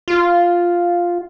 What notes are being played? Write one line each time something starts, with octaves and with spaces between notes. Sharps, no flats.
F4